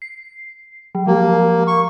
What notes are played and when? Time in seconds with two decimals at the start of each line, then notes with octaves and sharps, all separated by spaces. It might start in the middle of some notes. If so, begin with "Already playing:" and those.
0.02 C7
0.95 F#3
1.06 F3 G#3 A#3 G4
1.67 C#6